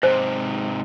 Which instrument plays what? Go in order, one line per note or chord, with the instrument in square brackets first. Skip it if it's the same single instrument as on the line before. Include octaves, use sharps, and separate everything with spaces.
[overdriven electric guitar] G#2 C3 [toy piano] C5